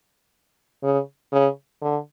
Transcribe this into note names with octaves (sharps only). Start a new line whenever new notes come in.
C#3
C#3
D3